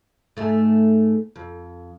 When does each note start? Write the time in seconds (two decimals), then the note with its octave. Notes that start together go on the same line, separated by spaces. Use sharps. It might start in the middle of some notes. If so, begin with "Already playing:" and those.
0.37 G#2 A3
1.36 F2